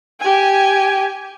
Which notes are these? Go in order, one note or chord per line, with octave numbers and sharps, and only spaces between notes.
G4 G#5